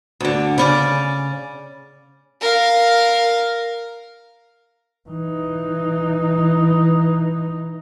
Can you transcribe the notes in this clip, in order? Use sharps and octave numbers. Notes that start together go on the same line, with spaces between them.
D2 D3
C#3 C#4 D5
A#4 F5
E3 D#4